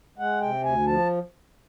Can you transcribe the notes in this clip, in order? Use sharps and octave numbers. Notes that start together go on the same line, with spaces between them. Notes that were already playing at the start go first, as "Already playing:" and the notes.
G#3 F#5
C3 G5
D2 G#5
F3 A5